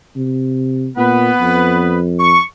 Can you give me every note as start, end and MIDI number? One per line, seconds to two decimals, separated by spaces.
0.16 0.88 48
0.97 1.30 46
0.97 1.99 59
0.97 1.99 71
1.41 2.38 41
2.20 2.42 85